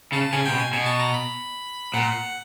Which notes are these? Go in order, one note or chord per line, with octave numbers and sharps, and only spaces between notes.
C#3 A5
C#3 G#5
C3 G5
B2
G#5
B2 G#5
A5
A#5
B5
A#2 F#5